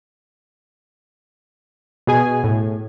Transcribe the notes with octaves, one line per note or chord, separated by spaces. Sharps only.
B2 G#4 G#5
A2